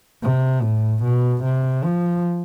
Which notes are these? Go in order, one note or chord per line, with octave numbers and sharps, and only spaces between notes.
C3
A2
B2
C3
F3